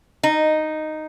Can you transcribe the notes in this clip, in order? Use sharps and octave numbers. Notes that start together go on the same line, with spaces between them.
D#4